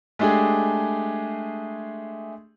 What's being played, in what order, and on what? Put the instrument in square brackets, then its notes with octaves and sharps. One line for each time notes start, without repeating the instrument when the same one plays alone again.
[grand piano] G#3 A3 D4 G4 G#4